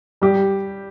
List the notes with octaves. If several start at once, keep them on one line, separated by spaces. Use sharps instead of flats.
G3 G4